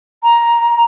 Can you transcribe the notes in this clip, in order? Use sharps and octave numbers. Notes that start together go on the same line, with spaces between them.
A#5